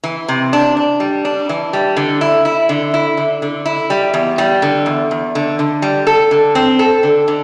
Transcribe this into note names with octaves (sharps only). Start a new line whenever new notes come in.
E3
C3
D4
D4
G3
D4
E3
G3
D3
E4
E4
D3
E4
D3
D3
E4
G3
E2
G3
D3
E2
E2
D3
D3
G3
A4
D3
C4
A4
D3
D3